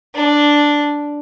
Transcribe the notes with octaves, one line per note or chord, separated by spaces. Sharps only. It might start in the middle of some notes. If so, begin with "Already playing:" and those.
D4